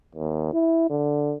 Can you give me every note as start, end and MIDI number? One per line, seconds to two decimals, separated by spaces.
0.15 0.50 39
0.53 0.88 64
0.90 1.35 50